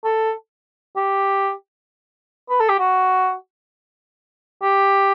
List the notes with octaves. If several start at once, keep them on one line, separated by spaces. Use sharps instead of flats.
A4
G4
B4
A4
G4
F#4
G4